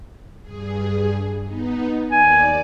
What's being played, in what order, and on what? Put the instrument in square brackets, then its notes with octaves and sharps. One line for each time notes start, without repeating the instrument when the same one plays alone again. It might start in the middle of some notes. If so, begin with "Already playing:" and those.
[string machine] G2 G#4
B3 D#4
[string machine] D#2 D5 [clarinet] G#5